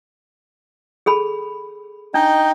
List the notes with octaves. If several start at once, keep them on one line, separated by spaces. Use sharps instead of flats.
G#4 A4 B5
D4 D#4 D#5 G5